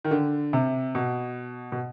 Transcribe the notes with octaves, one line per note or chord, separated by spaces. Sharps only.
D#3
D3
C3
B2
B2